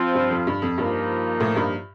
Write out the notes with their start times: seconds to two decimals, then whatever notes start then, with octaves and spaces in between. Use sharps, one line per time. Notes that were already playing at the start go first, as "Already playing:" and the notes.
Already playing: F3 C4 F4
0.15 G2
0.31 F2
0.47 G2
0.62 F2
0.78 G2 F3 A#3 D#4
1.40 A2
1.56 G2